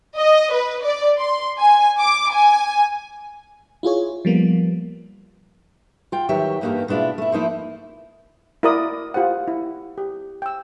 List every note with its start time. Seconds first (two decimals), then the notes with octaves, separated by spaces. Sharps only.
0.18 D#5
0.53 B4
0.82 D5
1.18 C6
1.59 G#5
2.00 D6
2.31 G#5
3.83 E4 F4 G#4 C#5
4.25 F3 G3 A#3 B3
6.12 F4 G5
6.29 E2 D#3 F#3 G4 C#5 E5
6.61 E2 G2 A#3 D#4 G4 A4
6.88 B2 G#3 D4 E4 F4
7.18 A3 E4
7.32 F3 A#3 D#4 E4
8.63 E4 F#4 A#4 D5 D#5 D#6
9.14 F4 G4 C5 F#5
9.48 E4
9.98 G4
10.42 G5 E6